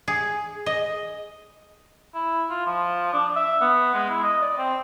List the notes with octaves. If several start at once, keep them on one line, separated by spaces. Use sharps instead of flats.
G#4
D#5
E4
F4
F3
D4
E5
B3
G#3
E4
D#5
D5
C4